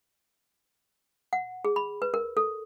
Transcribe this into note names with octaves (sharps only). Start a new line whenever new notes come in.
F#5
G#4
B5
B4
A#4
A4